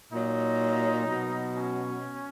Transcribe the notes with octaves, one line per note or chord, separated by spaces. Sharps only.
A#2 F#3 D#4
B2 F#3
C#4